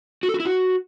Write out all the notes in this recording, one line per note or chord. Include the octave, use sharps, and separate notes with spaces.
F#4
A4
F#4
E4
F#4